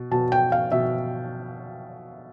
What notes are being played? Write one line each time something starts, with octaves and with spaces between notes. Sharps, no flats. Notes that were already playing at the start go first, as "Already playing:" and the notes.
Already playing: B2
B2 A5
G5
F5
B2 E5